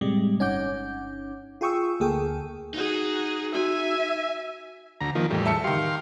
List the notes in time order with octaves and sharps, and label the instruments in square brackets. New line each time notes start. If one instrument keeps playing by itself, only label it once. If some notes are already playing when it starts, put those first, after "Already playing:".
[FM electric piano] A2 C3 G3 G#3
G1 C#4 D#4 F#5 D6 G6
F4 G#4 G5 C#6 D#6 E6
D2 A#3 G#4 A4 G5
[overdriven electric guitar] D#4 [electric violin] F#4 G#4
[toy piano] F#4 [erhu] E5 [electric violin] G#5
[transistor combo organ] D2 A#5
D#3 F3 A#3
E2 A2 G3
[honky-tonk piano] E5 A5 C#7
[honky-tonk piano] D#3 G4 [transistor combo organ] F5 C6